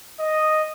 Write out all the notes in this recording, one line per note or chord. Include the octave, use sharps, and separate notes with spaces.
D#5